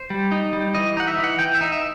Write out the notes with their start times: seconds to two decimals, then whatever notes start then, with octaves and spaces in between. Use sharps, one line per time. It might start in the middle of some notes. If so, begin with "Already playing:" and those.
Already playing: C5
0.10 G3
0.32 D#4
0.53 G3
0.75 E3 D#5
0.97 D#4 F#5
1.08 E5
1.18 E3
1.24 F#5
1.39 E3 G5
1.55 E5
1.61 D#4
1.72 E5